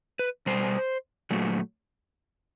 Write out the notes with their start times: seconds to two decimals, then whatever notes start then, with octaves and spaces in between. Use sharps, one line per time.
0.19 B4
0.46 B2 G3 C5
1.30 A#2 F#3 A3